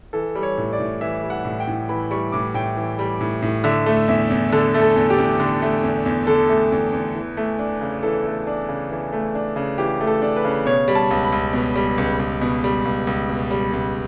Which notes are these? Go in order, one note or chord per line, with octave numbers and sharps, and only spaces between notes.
E3 A4
G3
C#5
A2
D5
A2
E3 E5
G3
F#5
A2
G5
A2
E3 B5
G3 C#6
A2 D6
A2 G5
E3
G3
A2
A2
D3 E5
A3
E2 E5
E2
D3 A4
A3
A4
E2
G4
E2
D3
A3
E2
E2
D3 A4
A3
E2
E2
E3
A3
D4
C#3
E3 A4
A3
D4
C#3
E3
A3
D4
C#3
E3 G4
A3
A4
D4
B4
C#3
B2 C#5
G3
A5
C#2
B5
C#2
B2
G3
C#2
C#2
B2
G3
C#2
C#2
B2
G3
C#2